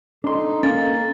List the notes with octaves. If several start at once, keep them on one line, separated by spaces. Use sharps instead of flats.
D4 D#4 A4 C6
A#3 C#4 A6